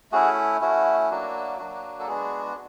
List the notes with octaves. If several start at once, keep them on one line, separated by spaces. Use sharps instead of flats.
A3 C#4 E4 F#4 G#4
A3 C#4 E4 F#4
F#3 A#3 D4 F#4
F#3 A#3 D4 F#4
A4
G#3 B3 D4 F#4 G#4